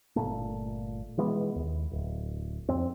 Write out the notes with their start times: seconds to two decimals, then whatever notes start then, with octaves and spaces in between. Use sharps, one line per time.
0.16 G1 A#2 A3
1.17 B2 E3 G#3 B3
1.56 D#2
1.91 D1
2.69 F2 C4